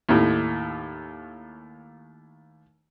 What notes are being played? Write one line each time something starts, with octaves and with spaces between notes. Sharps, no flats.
D#2 A2